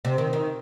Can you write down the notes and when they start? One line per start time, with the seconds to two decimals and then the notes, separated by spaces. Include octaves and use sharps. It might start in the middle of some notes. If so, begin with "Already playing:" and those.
0.05 C3
0.18 D#3
0.33 D#3